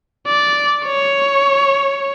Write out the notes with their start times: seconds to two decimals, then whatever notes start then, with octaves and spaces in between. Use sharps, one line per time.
0.27 D5
0.86 C#5